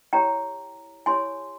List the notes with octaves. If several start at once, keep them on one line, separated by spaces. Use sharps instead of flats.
E4 G4 C#5 G5 A#5
E4 G4 C#5 G#5 C6